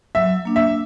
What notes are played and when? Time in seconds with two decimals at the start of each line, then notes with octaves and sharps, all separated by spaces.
0.15 F#3 E5
0.45 A#3 D4
0.56 E5